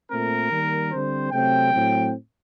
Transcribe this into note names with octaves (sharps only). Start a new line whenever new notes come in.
A#2 A3 C4 A#4
D#3 G3 A#3
D3 G3 C4 C5
C3 F#3 A3 C4 G5
A2 F#3 C4